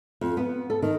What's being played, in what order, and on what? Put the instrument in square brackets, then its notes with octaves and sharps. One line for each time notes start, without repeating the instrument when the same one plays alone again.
[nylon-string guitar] F2
B3
A4
D#3